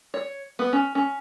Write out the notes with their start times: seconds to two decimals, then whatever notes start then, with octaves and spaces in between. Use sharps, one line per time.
0.14 C#5
0.59 B3
0.73 C#4
0.95 C#4